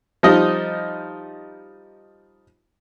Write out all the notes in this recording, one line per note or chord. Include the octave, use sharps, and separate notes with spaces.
F3 G3 D#4 D#5